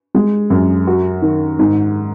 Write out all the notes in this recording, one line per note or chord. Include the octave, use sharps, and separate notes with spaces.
G#3
F#2
F#4
D#3
G#2